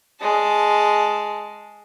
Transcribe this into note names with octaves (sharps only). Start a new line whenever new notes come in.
G#3 A5